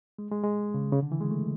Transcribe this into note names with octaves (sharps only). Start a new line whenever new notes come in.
G#3
G#3
G#3
C#3
C#3
D3
E3
G#3
A3